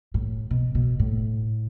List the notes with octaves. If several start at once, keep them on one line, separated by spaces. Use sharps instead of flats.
A2
B2
B2
A2